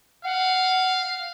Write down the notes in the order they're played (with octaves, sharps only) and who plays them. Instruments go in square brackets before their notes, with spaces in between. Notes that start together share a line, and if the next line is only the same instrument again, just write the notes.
[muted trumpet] F5 [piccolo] F#5